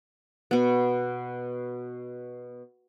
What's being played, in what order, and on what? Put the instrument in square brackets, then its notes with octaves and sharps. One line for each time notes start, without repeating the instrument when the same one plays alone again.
[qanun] B2 B3